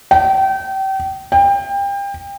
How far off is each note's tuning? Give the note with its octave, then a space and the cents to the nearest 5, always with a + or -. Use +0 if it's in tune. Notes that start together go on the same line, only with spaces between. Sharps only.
G5 -30
G5 +30